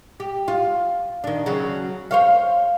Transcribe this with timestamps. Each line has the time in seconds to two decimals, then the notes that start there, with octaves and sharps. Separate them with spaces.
0.20 G4
0.48 F4
1.24 D#3 D4
1.46 C#3 F#3
2.11 C5 C#5 F5